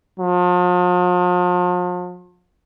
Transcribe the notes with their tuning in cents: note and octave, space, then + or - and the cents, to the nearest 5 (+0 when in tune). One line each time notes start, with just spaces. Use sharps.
F3 +40